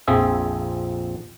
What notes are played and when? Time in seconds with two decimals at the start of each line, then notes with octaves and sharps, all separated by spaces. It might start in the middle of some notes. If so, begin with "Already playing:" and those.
0.08 A#1 F2 F3 C4 G#4 E5